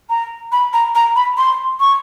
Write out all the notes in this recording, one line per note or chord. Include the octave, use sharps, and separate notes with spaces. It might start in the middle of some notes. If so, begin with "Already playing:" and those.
A#5
B5
A#5
A#5
B5
C6
C#6